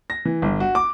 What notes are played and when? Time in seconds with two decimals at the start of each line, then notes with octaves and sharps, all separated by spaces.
0.10 A#6
0.25 E3
0.42 G1
0.60 F#4
0.75 D6